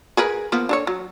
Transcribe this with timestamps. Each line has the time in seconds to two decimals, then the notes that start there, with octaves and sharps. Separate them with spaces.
0.17 G#4 A#4 B4
0.52 F3 A#3 B3
0.69 D4 A4 C#5
0.87 F#3